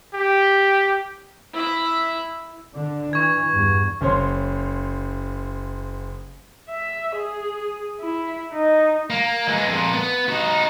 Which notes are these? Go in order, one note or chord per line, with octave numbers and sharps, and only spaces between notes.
G4
E4 E5
D3 D4
E3 C#6 G#6
E2 G2
F#1 C#4 C5 C#5 C6
E5
G#4
E4
D#4
A#3
E3 G#3
F2 A#2
B3
D#4 F#4